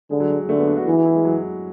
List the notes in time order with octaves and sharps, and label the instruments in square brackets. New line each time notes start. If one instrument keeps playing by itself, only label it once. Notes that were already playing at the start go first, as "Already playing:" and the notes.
[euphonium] D3 [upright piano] G#3
[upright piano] F#3
G#3
G#3
[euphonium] D3 [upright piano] A3
[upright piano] B3
D4
F#4
[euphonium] E3 [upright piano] G#4
[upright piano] F#4
E4
G#3
F#3